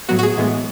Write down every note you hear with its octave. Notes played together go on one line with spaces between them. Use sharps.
A2 F#3 B3 F#4
F#4
G#4
A2 E3 G#3 B3